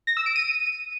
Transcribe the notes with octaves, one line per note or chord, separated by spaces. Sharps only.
A#6
E6
D7
D#7